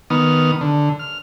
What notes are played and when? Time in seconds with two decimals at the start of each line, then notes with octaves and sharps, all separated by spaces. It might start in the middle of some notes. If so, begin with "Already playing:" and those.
0.10 D#3 B3 D#6 F6
0.61 D3
0.99 F6